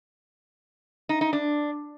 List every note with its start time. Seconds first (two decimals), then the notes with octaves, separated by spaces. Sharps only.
1.09 D#4
1.21 D#4
1.33 D4